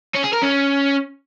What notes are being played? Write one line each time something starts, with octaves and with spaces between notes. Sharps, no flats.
C#4
G#4
A#4
C#4